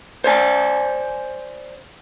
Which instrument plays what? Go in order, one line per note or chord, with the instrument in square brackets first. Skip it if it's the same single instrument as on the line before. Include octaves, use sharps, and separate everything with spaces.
[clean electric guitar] C5 D5 G#5